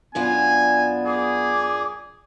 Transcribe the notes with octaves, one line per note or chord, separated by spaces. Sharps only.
F#2 B3 D4 F4 G#5
G#4 D6